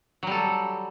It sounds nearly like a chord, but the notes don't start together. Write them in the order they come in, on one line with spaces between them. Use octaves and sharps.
F#3 G3 A4